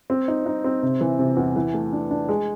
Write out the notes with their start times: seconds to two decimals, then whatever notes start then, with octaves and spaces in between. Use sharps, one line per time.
0.10 C4
0.28 D#4
0.46 D#4
0.64 C4
0.83 C3
1.01 E3
1.19 C3
1.37 E2
1.56 E3
1.74 A3
1.93 D4
2.11 D4
2.29 G#3